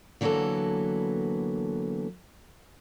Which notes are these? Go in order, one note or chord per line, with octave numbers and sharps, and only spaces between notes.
D3 E3 F#3 A#3 B3 A4